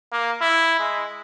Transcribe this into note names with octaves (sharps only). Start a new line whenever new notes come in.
A#3
E4
G#3